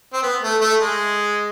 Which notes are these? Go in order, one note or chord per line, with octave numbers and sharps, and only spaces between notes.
C4
B3
A3
A3
G#3